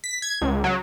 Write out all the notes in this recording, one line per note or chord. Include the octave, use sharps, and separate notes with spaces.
B6
G#6
C#2
F#3